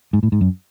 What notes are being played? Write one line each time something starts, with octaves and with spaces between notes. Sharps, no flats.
G#2
A2
G#2
F#2